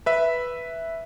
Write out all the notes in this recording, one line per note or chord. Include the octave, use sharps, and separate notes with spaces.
B4 E5